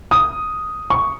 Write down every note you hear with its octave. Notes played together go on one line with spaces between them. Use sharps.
D#6
C#6